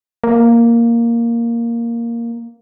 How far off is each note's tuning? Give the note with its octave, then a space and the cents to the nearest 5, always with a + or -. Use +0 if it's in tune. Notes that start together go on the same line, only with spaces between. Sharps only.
A#3 +0